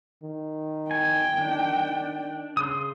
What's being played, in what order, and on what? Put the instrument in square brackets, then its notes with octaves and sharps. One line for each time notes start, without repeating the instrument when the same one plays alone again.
[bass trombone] D#3
[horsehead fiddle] G5 [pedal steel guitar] G#5
[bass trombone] D#3 [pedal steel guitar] D4
[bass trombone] C#3 [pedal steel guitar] C6 D#6